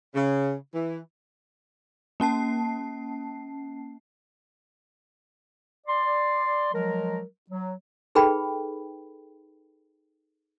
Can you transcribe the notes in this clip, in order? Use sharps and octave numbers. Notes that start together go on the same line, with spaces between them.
C#3
E3
A#3 C#4 A5 C7
D5 C6
F3 F#3 G#3 A#4
F#3
D#4 G#4 A4 B4 G5 B5